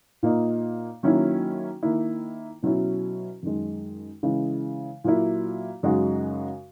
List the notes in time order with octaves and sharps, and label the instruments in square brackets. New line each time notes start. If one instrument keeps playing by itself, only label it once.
[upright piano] A#2 A#3 D#4
D#3 F#3 A#3 C#4 E4
D#3 A#3 E4
B2 F#3 C#4 E4
F#2 D#3 G#3
C#3 E3 G#3
A#2 F#3 A#3 E4
F#2 C#3 G#3 D#4 F#4